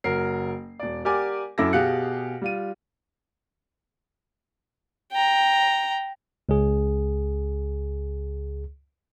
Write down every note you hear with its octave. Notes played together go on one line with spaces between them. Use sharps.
F#1 F#3 A#4 C7
E1 D5
G4 A#4 D5 F#5 G#5 D6
F#2 E4 A4 D6 E6 A#6
B2 G4 G#4 F5 F#6 C#7
G3 F4 D#7
G5 A#5
C#2 G#4